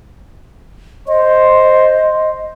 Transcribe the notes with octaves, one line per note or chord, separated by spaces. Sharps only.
C5 D#5